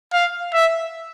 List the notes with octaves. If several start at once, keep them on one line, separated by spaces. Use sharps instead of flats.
F5
E5